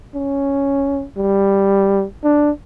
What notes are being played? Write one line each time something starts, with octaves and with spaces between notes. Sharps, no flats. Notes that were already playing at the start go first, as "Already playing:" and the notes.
C#4
G3
D4